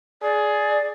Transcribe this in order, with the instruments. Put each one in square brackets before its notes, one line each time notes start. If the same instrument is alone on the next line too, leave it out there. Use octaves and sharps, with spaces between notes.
[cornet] G#4 [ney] D5